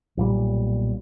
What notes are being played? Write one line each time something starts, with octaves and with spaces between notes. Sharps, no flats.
B1 A#2 G3